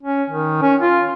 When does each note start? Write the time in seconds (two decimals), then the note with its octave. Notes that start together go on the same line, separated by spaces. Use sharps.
0.03 C#4
0.30 D#3
0.62 C#4
0.81 F4